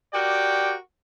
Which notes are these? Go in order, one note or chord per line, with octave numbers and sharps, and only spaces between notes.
F#4 G4 A#4 D5 G5